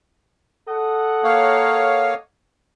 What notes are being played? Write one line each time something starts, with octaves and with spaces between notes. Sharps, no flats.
A4 D#5 F#5
A#3 C#5 F5